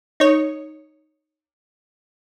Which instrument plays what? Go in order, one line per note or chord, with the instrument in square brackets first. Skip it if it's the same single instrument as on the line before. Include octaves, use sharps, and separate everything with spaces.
[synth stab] D#4 C#5